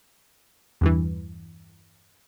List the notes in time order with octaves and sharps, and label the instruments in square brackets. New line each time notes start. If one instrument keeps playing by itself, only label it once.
[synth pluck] E2 G2 E3